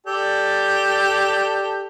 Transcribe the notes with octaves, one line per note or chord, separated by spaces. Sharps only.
G4 A4 D5